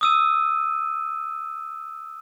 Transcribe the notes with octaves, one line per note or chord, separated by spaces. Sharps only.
D#6 E6 D#7